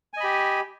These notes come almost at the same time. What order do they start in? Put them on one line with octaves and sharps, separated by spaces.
G#5 D#5 B5 G4